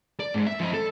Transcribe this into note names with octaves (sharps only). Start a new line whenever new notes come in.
D5
G#2 G#3
E5
F3 D#5
A4